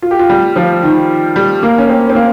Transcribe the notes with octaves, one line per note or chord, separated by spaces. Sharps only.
F4
G4
F4
G3
F3
D#3
G3
A#3
C#4
C4
C4
A#3